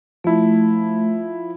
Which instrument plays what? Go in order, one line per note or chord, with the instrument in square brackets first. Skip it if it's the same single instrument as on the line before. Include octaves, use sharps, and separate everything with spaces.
[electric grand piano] F3 E4 [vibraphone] A3